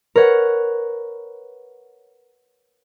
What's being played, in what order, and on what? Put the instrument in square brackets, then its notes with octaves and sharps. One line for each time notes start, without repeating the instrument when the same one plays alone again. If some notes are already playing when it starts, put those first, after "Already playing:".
[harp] A#4 B4 C#5 F#5